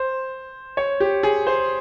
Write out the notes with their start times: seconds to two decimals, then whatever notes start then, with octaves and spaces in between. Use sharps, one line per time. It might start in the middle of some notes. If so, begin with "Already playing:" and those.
Already playing: C5
0.77 C#5
1.00 G4
1.23 G#4
1.47 C5